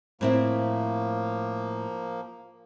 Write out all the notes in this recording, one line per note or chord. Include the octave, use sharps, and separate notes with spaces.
A2 F3 A#3 C4 E4